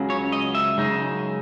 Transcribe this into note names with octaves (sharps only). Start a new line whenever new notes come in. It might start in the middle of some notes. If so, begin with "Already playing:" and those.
Already playing: C#2 C#3 F#3
C#5
D#5
E5
F#2 C#3 G#3 D#4